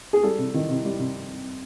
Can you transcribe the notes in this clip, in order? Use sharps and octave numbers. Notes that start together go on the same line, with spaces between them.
G#4
G3 A4
C3
D#3
C3
G3
C3